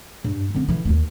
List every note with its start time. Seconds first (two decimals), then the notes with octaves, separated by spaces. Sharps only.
0.24 G2
0.55 D3 C4
0.69 D3 E3
0.85 E1 D#2